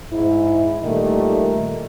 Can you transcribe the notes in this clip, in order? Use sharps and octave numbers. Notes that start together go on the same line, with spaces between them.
G#2 E4
A#2 D#3 G3 A3 D#4